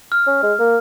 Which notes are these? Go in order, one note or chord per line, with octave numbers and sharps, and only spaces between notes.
F6
C#4
G#3
A#3